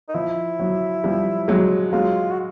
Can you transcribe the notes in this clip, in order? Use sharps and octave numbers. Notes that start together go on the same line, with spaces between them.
D#4
F3 E4
F#3
F3 G3
F#3 G#3
F#3 G#3 F4
F#4